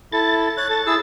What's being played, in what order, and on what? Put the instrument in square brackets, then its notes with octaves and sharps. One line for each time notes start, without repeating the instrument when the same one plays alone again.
[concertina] E4 A4 [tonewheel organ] A6
[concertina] C#5 F#6
A4
E4 G#4 E6